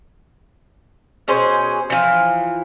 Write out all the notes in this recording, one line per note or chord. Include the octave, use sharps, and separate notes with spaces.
B2 C#4 G#4 C5
E3 F3